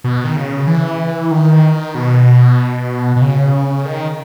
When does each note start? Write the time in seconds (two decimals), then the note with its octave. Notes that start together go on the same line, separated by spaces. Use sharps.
0.04 B2
0.24 D#3
0.36 C#3
0.67 E3
1.31 D#3
1.95 B2
3.16 B2
3.22 C#3
3.85 D#3